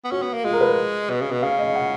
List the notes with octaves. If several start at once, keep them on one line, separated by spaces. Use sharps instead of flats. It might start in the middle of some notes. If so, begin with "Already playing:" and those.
B3
C#4 F#4
B3
A#3
G#3 F4
A#4
B4
B2
C#3
B2
C#3 F5
D#5
F#5